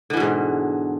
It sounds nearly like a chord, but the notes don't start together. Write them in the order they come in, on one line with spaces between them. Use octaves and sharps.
D3 E3 B2 G#2